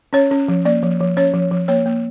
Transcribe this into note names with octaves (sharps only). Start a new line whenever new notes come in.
C#4 C#5
C#4
F3
A#3 D5
F3
F3
C#4 C#5
F3
F3
A#3 C#5
A#3